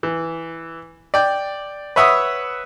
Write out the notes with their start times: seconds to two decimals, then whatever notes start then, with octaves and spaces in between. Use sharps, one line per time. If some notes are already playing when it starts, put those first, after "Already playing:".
0.03 E3
1.14 D5 G5
1.96 B4 C#5 E5 F#5 B5 D#6